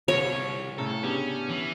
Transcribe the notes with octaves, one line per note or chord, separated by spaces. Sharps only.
C2 C#5
A2 C#3 A4 A#5
B3 C#4 D4 G4
E3